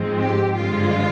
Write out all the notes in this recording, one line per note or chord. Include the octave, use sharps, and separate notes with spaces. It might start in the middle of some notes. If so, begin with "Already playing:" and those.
Already playing: G#2 F3 G#3 C4
G4
G2 D3 F3 G#3 F4